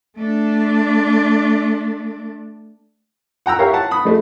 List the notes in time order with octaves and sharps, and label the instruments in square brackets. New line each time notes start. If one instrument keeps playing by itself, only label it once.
[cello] A3 D4
[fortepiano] F#5 G5 A#5 E6
G4 A#4 C#5 E5 F5
F#5 A5
B5 D#6
G#3 A3